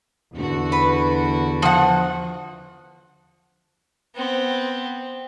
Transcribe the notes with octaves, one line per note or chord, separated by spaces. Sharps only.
E2 D3 F#4
B4
F3 F#5
B3 C4